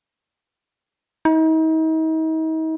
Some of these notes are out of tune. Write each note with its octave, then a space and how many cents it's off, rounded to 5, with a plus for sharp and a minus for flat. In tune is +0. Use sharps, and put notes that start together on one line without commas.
D#4 +40